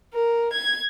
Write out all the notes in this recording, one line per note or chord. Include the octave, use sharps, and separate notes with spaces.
A#4
G#6